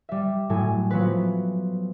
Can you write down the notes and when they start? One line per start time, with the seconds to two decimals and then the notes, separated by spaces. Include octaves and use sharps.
0.09 G3 E5
0.50 A2 F#3 A4 G#5
0.91 F3 F#3 B3 B4